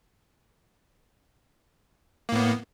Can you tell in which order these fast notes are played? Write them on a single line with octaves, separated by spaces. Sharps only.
A#3 A2 B3